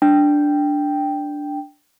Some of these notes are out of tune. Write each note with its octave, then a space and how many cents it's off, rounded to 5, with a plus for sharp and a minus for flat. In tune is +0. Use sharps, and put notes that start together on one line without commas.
D4 +0 G5 +0